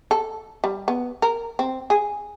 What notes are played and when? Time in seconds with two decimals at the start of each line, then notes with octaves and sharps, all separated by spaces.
0.11 A4
0.64 G3
0.88 B3
1.22 A#4
1.59 C4
1.90 G#4